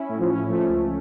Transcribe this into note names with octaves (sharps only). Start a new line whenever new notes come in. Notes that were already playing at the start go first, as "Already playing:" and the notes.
Already playing: C#4 E4
A2
F3
C#4
F3 A3
C#2